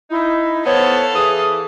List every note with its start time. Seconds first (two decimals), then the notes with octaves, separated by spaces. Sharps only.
0.10 D#4 E4
0.66 B3 A4 C5 C#5 F5
1.15 E3 G#4 D#6